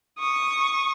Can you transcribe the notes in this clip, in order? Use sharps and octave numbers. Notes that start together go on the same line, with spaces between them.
C#6 D#6